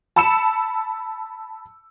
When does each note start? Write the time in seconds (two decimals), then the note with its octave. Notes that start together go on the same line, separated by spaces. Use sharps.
0.16 A5 B5 E6 C#7 E7